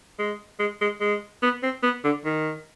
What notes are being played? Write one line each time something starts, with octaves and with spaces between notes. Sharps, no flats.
G#3
G#3
G#3
G#3
B3
C4
B3
D3
D#3